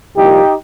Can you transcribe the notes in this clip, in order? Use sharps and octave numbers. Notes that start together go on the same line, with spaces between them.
C2 A#2 F3 D#4 G4